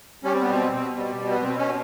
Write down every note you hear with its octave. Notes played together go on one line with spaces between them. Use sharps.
G3 C#4
C4
B3
B2 C4
B2
G3
B2
B3
B2 C4
C#4